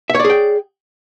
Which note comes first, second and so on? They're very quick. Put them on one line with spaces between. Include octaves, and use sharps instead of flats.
E5 C#5 D5 G#4 G5